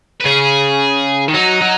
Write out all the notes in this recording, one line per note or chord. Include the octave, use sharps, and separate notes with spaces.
B4
C#3 G#4
D#3
F#3 D#4
F#3